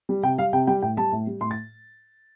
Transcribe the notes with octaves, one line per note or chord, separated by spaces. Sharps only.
G3
C3 G5
G3 F5
C3 G5
G3 G5
A2 G5
G3 A5
A2
G3
A2 C6
A6